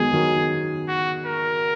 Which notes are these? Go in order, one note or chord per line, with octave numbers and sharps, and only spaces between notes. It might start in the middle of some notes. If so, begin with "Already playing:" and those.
Already playing: D#3 F#3 G#3 B3 G#4
D#3 F#3
F#4
A#4